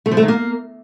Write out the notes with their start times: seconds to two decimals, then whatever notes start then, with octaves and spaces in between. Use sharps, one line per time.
0.06 A3
0.11 F3
0.17 A3
0.23 D#3
0.28 A#3